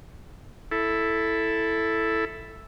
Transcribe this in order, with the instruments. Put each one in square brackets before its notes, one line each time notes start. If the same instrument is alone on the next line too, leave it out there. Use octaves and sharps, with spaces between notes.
[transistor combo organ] E4 A4